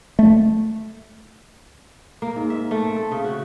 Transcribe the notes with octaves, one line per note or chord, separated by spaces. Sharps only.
A3
A#3
G#2
E5
A3
C4
A4
C#3
F#4